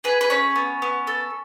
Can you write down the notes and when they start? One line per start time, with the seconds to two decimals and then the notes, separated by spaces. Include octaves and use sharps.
0.04 G#4 B4
0.21 B4
0.30 A3 C#4 C#5
0.56 B3
0.82 B3
1.07 A4